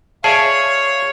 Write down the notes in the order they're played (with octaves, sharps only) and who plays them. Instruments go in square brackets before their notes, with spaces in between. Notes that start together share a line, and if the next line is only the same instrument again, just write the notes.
[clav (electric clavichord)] G#4 D5 E5 [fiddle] C#5 [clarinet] F5 [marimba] A5